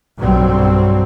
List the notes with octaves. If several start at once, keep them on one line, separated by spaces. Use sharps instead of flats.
B1 G2 F#3 G3 C4